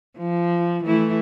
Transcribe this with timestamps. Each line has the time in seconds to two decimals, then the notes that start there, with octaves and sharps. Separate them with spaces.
0.18 F3
0.84 E3 A3 E4